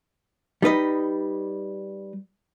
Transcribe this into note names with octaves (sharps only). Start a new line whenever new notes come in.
G3 D#4 B4 D#5